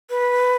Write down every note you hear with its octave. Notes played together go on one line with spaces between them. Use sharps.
B4